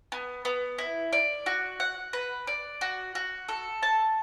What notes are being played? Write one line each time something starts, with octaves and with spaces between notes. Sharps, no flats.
B3
B3
E4
D5
F#4
F#5
B4
D5
F#4
F#4
A4
A5